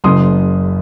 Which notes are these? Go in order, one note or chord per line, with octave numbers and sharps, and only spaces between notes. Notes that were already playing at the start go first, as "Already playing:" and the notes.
F#1 F#2 C#3 C6 D#6